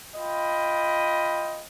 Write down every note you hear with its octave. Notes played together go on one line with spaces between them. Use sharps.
F4 D#5 G5 B5